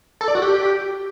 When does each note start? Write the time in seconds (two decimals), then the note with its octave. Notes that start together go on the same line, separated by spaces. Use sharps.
0.21 A4
0.28 D5
0.35 F#4
0.42 G4